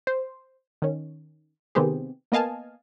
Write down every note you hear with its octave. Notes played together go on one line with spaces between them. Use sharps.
C5
D#3 C#4
C3 D#3 B3 C4 G4 G#4
A#3 B3 D#5 F5 G#5 A5